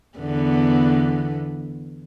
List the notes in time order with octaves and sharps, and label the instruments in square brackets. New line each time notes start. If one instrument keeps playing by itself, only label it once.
[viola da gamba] E2 D3 B3